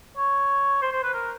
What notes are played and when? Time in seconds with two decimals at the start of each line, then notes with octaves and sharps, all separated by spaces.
0.17 C#5
0.82 C5
0.92 C5
1.03 B4
1.14 A#4